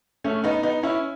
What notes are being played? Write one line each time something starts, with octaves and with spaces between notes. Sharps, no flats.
A3 C#4
B3 D#4
B3 D#4
C#4 E4